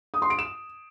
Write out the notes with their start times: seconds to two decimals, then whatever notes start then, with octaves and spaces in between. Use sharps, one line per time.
0.14 D#6
0.22 C6
0.30 D7
0.39 E7